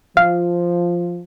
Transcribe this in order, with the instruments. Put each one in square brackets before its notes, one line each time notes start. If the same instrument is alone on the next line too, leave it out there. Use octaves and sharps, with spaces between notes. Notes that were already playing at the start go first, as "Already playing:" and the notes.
[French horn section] F3 [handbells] F5 F6